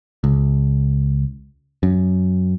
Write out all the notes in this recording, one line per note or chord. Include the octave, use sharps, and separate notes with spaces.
C#2
F#2